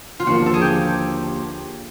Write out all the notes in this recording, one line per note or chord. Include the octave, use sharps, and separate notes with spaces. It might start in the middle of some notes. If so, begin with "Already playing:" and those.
F4
D#2 D3 F3 A#3 F#4
A4
G#4
G4